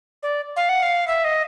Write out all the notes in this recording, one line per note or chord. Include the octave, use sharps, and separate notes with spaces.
D5
F5
F#5
F5
E5
D#5